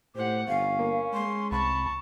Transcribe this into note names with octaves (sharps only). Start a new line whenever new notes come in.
A2 G4 C5 F#5
G1 C#4 F5
A#3
G#3 C6
C2 A5 B5 C#6